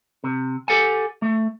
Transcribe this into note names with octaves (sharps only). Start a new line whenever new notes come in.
C3
G4 A4 F#5 G#5
A3